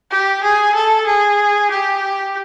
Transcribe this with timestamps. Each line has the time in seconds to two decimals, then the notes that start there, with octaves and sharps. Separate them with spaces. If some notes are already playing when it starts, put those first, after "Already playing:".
0.11 G4
0.43 G#4
0.75 A4
1.06 G#4
1.70 G4